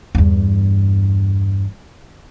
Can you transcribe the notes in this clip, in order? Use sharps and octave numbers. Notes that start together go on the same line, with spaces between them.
E2 G2